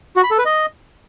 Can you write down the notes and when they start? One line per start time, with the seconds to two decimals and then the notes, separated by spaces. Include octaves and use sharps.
0.16 F#4
0.24 B5
0.31 A4
0.38 B4
0.45 D#5